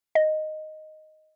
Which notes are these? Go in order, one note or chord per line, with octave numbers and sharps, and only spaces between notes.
D#5